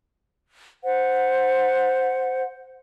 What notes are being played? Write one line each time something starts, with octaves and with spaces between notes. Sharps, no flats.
C5 F#5